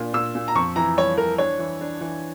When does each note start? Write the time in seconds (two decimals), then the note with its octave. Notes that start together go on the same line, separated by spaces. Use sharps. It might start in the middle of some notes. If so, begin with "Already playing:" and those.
Already playing: A#2 D4
0.13 A#2 E6
0.35 A#2
0.48 A#5
0.55 F2 C#6
0.76 E3 A#5
0.97 G3 C#5
1.18 E3 A#4
1.38 D4 C#5
1.59 E3
1.81 D4
2.01 E3